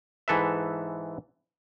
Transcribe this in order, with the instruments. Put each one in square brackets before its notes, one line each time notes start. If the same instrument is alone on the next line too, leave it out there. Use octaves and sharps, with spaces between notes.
[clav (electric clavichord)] G#2 E3 A4 B4 E5